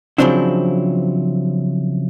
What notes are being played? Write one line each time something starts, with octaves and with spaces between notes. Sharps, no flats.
C#3 F3 F#3 C4 D4 E4